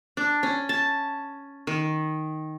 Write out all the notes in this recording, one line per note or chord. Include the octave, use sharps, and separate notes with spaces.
D4
C#4
A5
D#3